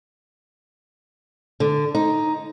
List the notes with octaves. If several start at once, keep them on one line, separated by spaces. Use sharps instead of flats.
D3
D#4